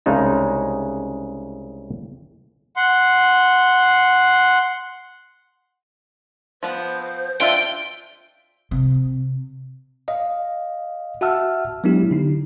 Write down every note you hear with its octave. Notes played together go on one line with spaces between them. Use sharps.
C2 C#3 G#3 D#4 A5
F#5 C6
F3 B3 C5
D4 F4 E5 G5
C3
D#5 F5
F#4 E5 F#5 A5 E6 F6
F#3 G#3 B3 D4 E4 G4
D3 D#4